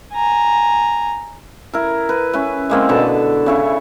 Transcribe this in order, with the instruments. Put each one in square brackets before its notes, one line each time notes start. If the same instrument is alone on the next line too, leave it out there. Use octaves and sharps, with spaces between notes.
[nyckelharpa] G#5 A#5
[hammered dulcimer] E4 A#4
B4
C#4 E4 B4
G#3 A#3 C4
B2 D3 B4 A5
C#3 E4 C#5